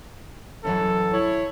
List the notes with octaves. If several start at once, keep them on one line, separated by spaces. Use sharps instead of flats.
F#2 E3 F#3 A4
E4 C#5